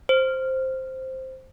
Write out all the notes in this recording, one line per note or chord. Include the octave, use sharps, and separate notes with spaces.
C5